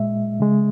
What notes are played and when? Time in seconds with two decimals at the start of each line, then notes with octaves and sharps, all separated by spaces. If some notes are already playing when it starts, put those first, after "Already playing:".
Already playing: A#2 G#3 E5
0.40 C#3 G#3